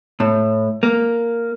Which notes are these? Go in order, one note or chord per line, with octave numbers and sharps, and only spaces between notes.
A2
A#3